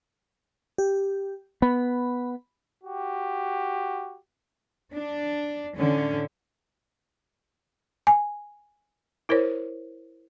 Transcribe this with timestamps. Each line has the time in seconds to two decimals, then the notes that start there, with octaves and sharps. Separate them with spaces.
0.78 G4
1.62 B3 B5
2.83 F#4 G4
4.93 D4
5.77 A2 D3 C#4
8.07 G#5
9.29 E4 A#4 C5 C#5